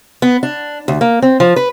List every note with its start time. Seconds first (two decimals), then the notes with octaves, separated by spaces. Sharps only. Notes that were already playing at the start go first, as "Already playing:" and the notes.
0.22 B3
0.43 D4
0.88 D2
1.01 A#3
1.22 C4
1.40 F3
1.56 B4